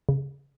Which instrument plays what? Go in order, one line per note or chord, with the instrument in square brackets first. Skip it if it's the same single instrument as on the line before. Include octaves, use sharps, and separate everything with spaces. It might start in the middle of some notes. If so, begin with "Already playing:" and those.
[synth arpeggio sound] C#3